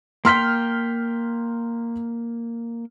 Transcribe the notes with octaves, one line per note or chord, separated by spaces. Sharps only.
A#3 G5 C6 F6 B6